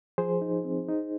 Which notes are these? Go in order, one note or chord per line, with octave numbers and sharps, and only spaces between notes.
F3 G#4 C5
D#4
C4
D#4